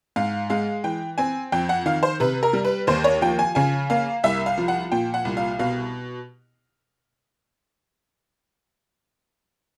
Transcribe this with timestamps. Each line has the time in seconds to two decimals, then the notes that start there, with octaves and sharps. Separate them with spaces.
0.16 G#2 F5
0.50 G#3 F5
0.84 E3 G5
1.18 C4 G#5
1.52 F2 G5
1.69 F#5
1.86 D#3 F5
2.03 C5
2.20 C3 B4
2.43 A#4
2.53 G3
2.65 B4
2.87 D#2 C5
3.04 C#5
3.21 F3 G5
3.39 G#5
3.55 C#3 G#5
3.90 A#3 F5
4.24 C2 E5
4.46 F5
4.58 F3
4.68 F#5
4.92 A#2 G5
5.14 F#5
5.25 C2
5.37 F5
5.59 B2 F5